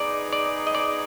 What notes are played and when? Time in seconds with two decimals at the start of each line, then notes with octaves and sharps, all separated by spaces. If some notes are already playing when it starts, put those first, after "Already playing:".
Already playing: B3 D#4 G#4 D5
0.33 D5
0.67 D#5
0.75 D5